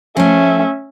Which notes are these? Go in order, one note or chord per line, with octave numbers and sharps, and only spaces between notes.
F3 A3 C#4 E5